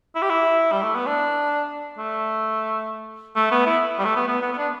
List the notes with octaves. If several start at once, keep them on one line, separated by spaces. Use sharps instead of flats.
E4
G4
E4
G3
A3
B3
D4
A3
A3
B3
E4
G3
A3
B3
B3
B3
B3
D4